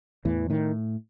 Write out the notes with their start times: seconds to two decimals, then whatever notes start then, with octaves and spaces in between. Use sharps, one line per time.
0.25 E2 A2 E3
0.50 A2 D#3